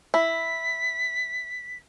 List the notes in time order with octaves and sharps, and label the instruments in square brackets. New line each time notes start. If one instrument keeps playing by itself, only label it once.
[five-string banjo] E4 [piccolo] B6